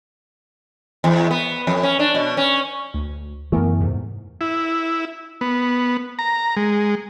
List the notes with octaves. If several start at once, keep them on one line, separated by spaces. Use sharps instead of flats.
E2
B3
F2
C#4
D4
B2
C#4
D2
F#2 E3 A3 B3 A#4
E2 G#2 C3
E4
B3
A#5
G#3